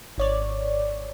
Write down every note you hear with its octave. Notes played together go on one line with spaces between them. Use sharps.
G#1 C#5 D5